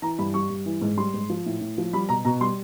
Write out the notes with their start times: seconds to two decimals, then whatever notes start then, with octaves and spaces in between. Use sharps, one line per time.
0.02 E3 A#5
0.19 G2 B5
0.34 G3 C#6
0.50 G2
0.66 E3
0.81 G#2
0.97 G3 C6
1.14 G#2
1.30 F3
1.46 A2
1.61 A2
1.78 F3
1.93 G3 B5
2.09 B2 A#5
2.25 B2 A#5
2.41 G3 C6